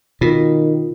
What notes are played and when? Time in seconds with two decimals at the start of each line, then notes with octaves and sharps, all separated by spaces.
0.21 B2 D#3 F4